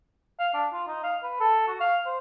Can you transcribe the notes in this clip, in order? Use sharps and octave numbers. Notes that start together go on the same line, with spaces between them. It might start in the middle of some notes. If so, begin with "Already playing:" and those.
F5
D4
F4
D#4
F5
B4
A4
F#4
F5
C5